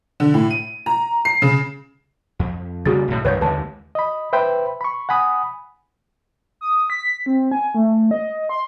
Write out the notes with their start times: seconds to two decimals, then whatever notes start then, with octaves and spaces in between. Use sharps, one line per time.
0.20 D3
0.34 A2
0.50 D#7
0.86 A#5
1.25 C7
1.42 C#3
2.39 F2
2.86 C#3 G3 A#3 F#4 G#4 A6
3.08 B1 A2
3.25 C2 G2 D#3 B4 C#5 G6
3.41 D#2 D3 G#3 B4 A5
3.95 D#5 B5
4.33 B4 C5 E5 G5 B5
4.81 B5 C#6
5.09 F#5 G#5 B5 D#6
6.61 D#6
6.90 B6
7.26 C4
7.52 G#5
7.75 A3
8.11 D#5
8.49 C6